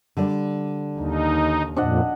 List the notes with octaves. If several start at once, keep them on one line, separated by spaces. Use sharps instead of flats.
D3 G3 D5
D#2 D#4
F2 A#2 D4 D#5 F#5